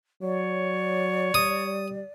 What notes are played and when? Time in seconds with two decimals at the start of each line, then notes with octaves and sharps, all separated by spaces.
0.23 F#3 C#5 D5
1.34 G3 D#6